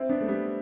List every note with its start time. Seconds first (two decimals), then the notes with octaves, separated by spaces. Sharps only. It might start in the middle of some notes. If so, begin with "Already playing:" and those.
Already playing: C4 E4
0.09 B3 D4
0.21 A3
0.28 G3 B3